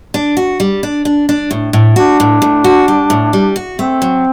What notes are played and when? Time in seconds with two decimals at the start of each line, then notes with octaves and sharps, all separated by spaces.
0.14 D4
0.37 F#4
0.60 G3
0.83 D4
1.05 D4
1.29 D4
1.51 A2
1.73 A2
1.96 D4 F#4
2.20 A2
2.42 A2
2.64 F#4
2.88 G3
3.10 A2
3.33 G3
3.56 F#4
3.78 A3 C4
4.02 F#3